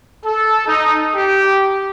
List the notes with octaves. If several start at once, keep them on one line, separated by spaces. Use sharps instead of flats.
A4
D#4
G4